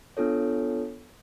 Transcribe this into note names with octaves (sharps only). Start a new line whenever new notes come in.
B3 D4 F4 A4 C#5